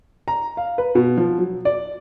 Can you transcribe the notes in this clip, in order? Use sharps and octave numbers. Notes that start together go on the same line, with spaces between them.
A#5
F5
B4
B2
F3
F#3
D5